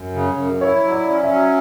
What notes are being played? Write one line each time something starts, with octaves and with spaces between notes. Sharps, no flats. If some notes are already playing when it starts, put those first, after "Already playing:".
Already playing: F#2
C#3
F#2
E4 C#5
F#3
D5
C#4
E5
F#3